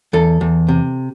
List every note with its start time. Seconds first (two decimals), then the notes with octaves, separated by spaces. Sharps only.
0.13 E2 A4
0.41 E2
0.68 C3